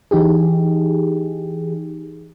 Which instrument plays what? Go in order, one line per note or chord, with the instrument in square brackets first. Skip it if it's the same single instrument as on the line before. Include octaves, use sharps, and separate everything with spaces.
[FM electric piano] E3 D#4 G4 G#4